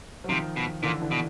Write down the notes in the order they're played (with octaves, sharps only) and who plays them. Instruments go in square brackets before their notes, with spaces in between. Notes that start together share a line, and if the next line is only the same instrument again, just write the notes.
[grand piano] F#3
[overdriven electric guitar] C3 [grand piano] D#3 F3
[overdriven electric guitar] B2
[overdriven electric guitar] A#2 [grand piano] D3 E3
[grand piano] D3 E3
[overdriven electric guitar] B2